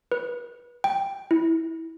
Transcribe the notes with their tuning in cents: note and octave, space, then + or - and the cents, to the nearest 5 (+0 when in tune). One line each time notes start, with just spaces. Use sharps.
B4 -25
G5 +10
E4 -15